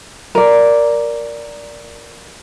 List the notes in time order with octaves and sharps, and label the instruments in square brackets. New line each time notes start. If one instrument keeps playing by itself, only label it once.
[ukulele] A#4 D5